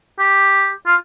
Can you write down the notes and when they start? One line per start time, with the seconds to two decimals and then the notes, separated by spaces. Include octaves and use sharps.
0.19 G4
0.86 F4